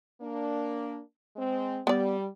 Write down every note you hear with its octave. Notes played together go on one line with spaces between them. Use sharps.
A#3 D4
G#3 C4
G3 B3 D5